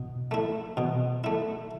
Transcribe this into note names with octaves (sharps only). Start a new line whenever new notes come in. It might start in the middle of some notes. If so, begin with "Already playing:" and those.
Already playing: B2
A3 E4
B2
A3 E4